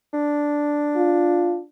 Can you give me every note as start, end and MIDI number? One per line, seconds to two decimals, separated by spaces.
0.13 1.66 62
0.96 1.58 65